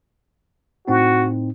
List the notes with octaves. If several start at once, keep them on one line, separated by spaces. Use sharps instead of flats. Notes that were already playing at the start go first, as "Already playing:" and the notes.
A2 C4 D#4 F#4